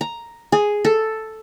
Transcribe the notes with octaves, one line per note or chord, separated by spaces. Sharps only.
A#5
G#4
A4